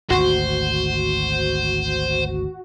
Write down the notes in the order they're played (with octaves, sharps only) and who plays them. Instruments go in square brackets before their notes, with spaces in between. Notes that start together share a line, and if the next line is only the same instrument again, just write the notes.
[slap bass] G#1 D2 [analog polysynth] F#4 [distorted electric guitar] C5